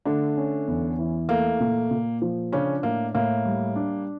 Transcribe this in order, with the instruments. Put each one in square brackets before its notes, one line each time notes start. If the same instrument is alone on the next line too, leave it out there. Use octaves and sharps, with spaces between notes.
[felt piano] D3 D4 [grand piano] A3
[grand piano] C#4
E2
E3
[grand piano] A3 [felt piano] A#3
[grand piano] A#2
A#2
F3
[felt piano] C#3 C#4 [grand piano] D4
[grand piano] A2 [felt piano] A#3
[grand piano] A2 [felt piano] A#3
[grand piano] G3
D4